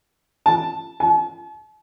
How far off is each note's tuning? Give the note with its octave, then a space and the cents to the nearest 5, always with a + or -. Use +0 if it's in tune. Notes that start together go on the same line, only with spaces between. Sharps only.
A5 +0
A5 -45